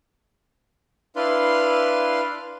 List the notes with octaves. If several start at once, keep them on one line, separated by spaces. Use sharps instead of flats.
D4 E4 B4 D5 F5 C6